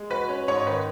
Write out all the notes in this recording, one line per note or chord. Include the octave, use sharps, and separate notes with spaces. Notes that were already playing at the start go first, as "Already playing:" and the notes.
Already playing: G#3
F#4 B4
C#4
G#2 C#5
D#3 B4